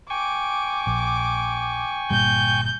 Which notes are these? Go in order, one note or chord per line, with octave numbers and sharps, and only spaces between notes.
G5 G#5 C#6 D6
A#1
G1 A#2 G3 G6